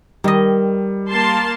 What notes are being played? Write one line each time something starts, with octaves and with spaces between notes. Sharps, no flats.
D#3 G3 D#5
A#3 A5 C6